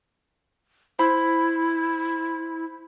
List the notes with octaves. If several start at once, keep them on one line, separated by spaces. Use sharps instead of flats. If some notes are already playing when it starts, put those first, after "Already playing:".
E4 C5 B5